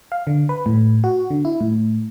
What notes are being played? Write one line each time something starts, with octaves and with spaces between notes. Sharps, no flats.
F5
D3
B4
A2
F#4
D3
E4
A2